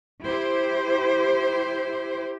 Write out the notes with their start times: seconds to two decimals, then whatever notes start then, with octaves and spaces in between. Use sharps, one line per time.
0.22 E4 G4 C5